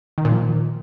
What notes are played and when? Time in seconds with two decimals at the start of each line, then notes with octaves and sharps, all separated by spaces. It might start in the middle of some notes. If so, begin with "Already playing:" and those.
0.18 D#3
0.25 A#2
0.32 F3